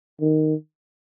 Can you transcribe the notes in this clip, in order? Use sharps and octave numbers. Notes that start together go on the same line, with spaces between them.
D#3